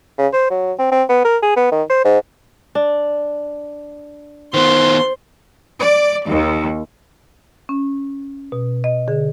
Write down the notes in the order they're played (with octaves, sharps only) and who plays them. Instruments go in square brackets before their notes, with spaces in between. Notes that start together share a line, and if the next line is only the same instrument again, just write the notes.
[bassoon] C#3
C5
F#3
C4
C4
B3
A#4
G#4
B3
D#3
C5
G#2
[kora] D4
[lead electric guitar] D#3 B3 [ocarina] C5 [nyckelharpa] C6
[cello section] D5
D#2
[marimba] C#4
B2
D#5
D3 G#4